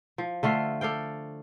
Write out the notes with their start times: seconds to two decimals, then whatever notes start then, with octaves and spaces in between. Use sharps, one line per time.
0.18 F3
0.43 D3 A3 F4 F5
0.81 A4 D5 F5 G5